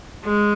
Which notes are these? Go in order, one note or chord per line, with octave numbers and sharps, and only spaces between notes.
G#3